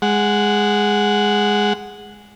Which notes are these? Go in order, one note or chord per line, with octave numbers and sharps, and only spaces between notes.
G#3 F#5